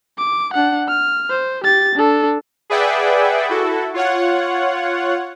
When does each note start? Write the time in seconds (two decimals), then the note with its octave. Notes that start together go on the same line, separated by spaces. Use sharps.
0.18 D6
0.54 D4 F#5
0.88 F6
1.30 C5
1.64 G4 A6
1.95 D4 A4
2.70 G#4 B4 D5 E5 F#5 G5
3.49 E4 F#4 A4
3.94 F4 C#5 F#5